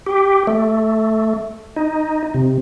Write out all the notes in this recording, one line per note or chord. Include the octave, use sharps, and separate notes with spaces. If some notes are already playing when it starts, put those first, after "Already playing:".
G4
A3
D#4
C3